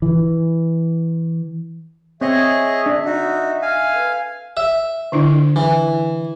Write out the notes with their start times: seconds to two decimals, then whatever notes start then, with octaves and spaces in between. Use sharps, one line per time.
0.02 E3
2.21 C4 G#4 C#5 D#5 E5
2.86 D4
3.05 D#4 F#4
3.62 F5 G#5
3.93 A4 B4
4.57 E5
5.12 D3 D4 E4
5.56 E3